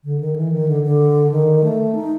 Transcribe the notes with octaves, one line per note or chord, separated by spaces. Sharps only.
D3
D#3
E3
D#3
D3
D3
D#3
A3
D#4